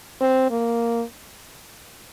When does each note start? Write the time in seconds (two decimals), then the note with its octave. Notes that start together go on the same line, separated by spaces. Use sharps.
0.21 C4
0.51 A#3